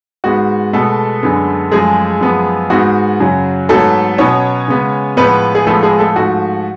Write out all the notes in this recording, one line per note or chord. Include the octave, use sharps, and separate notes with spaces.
G#2 G#3 B3 F#4
B2 G#3 A3 B3 A4
F#2 D3 G#3 B3
F#2 F3 G#3 A3 G#4
F#2 F3 B3
G#2 G#3 B3 F#4
F#2 C#3 F#3
G#2 F#3 A3 B3 A4
B2 F#3 B3 C#4 C#5
C#3 G#3 B3
A2 F3 G#3 B3 B4
G#4
A2 F3 G#3 A3 B3 A4
G#3 G#4
A3 A4
G#2 F3 A3 F#4